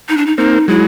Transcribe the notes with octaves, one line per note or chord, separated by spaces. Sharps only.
D#4
D4
D#4
A#3 C4 D#4
F#3 G#3 E4